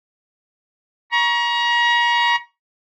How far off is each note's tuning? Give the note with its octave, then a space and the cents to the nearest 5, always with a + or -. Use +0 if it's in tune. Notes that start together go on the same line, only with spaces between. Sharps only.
A#5 +35 C#6 +5